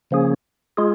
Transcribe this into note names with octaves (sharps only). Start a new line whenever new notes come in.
C#3 F3 A#3 C#4 G#4
G#3 F4 G#4